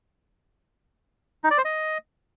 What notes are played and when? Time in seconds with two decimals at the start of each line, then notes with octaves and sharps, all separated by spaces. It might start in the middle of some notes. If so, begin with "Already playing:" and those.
1.44 D#4
1.51 D5
1.58 C5
1.65 D#5